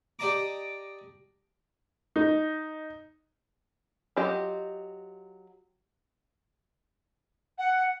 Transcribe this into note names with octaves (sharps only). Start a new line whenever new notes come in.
G4 D5 D#5 A5 A#5 D6
D#4
F#3 F4 G4 D#5
F#5